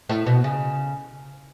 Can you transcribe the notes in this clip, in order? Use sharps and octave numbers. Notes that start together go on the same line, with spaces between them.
A2
B2
C#3